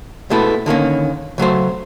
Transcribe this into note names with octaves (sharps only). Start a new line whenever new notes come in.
B2 G#3 A3 B3 E4
D3 D#3 A#3 C#4
C#3 F#3 A3 C5